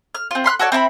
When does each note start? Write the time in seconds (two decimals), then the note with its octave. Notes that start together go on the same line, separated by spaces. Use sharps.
0.15 F6
0.31 C4 F4
0.44 B5 C6 F6 F#6
0.59 F#4 A4 C#5 D5
0.72 C4 E4 G5 B5